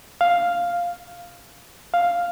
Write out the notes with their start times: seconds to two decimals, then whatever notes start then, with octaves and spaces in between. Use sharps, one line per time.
0.21 F5
1.94 F5